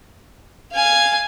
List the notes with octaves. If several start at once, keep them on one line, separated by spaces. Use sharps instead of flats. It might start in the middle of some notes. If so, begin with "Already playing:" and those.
F5 G#5